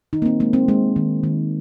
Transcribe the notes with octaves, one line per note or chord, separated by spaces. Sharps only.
D#3 D#4
A#3
C4
G#3 A#3
C4
G#3
D#3
D#3